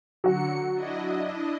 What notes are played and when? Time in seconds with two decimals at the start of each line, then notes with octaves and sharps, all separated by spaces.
0.24 D3 F#3 F#4 C#7
0.72 D4 E4 D#5